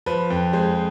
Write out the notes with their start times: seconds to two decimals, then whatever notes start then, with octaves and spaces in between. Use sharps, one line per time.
0.06 F3 B4
0.30 F2
0.53 G#3 C5